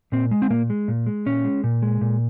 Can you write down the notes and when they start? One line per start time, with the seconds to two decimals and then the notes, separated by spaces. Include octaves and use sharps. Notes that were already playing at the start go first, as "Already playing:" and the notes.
0.12 A#2 C4
0.31 G#3
0.42 C4
0.50 A#2 A#3
0.70 G#3
0.88 A#2
1.06 G#3
1.26 A#2 C#4
1.44 G#3
1.64 A#2
1.82 G#3
2.01 A#2